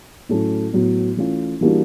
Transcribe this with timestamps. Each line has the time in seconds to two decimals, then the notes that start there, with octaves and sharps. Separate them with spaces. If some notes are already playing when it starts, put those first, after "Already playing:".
0.29 A2 F#3 A3 C#4
0.73 A2 F#3 B3
1.17 E3 A3 C#4 F4
1.61 E3 G3 A#3 D4 F#4